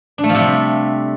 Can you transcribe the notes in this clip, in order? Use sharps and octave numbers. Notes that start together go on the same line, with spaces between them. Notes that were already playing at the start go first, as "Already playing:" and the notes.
D4
A3
F3
C3
G3